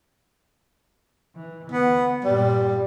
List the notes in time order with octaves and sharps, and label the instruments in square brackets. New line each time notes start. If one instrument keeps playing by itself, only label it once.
[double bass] E3
[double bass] D2 [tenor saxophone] B3
[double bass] G2 A#2 [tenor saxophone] G3